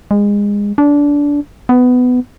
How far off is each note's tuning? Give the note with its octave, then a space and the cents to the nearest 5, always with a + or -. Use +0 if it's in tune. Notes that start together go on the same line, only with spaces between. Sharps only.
G#3 -25
D4 -20
B3 +15